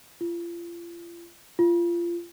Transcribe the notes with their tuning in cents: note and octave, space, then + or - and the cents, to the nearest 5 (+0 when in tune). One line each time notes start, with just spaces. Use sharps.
F4 -35
F4 -25